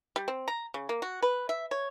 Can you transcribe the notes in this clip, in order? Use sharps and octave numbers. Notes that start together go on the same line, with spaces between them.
G3
C4
A#5
C#3
A#3
F#4
B4
E5
C#5